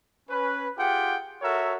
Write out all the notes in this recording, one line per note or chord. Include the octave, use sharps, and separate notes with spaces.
C#4 B4
F4 G4 G#4 F#5 G5
F#4 A4 A#4 C#5 E5